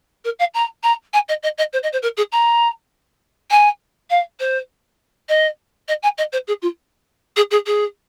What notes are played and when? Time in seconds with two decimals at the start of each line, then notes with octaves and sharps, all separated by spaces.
0.25 A#4
0.39 F5
0.54 A#5
0.83 A#5
1.13 G#5
1.28 D#5
1.43 D#5
1.58 D#5
1.73 C5
1.83 D#5
1.93 C5
2.02 A#4
2.17 G#4
2.32 A#5
3.51 G#5
4.10 F5
4.40 C5
5.29 D#5
5.88 D#5
6.03 G#5
6.18 D#5
6.32 C5
6.47 G#4
6.62 F4
7.36 G#4
7.51 G#4
7.66 G#4